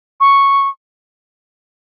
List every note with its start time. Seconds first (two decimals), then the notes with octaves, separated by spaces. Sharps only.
0.20 C#6